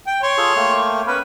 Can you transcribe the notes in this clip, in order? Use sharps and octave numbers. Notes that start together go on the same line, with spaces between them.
G5
C#5 C6
F4 G#4 A4
A3 A#3 G5
B3 C#4 A#4 B4